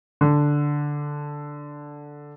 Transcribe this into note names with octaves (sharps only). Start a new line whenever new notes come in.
D3